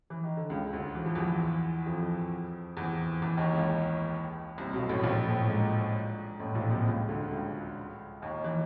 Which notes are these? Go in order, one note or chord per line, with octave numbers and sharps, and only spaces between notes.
E3
D#3
D3
C#2 C#3
D2 D3
E3
F3
E2 E3
F2 F3
E2 E3
E2 E3
D#2 D#3
C#2 C#3
C2 C3
B1 B2
A1 A2
A#1 A#2
A1 A2
G#2
A1 A2
A#1 A#2
C2 C3
C#2 C#3
D2 D3
C#2 C#3
D#2 D#3
E3